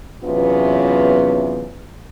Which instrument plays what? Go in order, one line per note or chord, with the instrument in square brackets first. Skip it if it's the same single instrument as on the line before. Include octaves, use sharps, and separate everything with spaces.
[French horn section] E2 C3 F#3 B3 C#4 F4